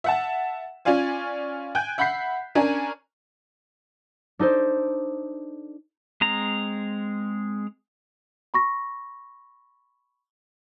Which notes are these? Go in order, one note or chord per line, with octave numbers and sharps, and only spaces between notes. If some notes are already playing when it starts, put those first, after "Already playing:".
E5 F#5 A5
C#4 F4 D5 F5 G#5
G5 G#5 F#6 G6
E5 F#5 B5 G6 B6 C7
C#4 D4 A#4 G#5
D4 D#4 A4 C5
G#3 C4 A#5
B5 C#6 A#6